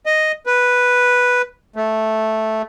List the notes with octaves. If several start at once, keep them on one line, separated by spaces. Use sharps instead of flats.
D#5
B4
A3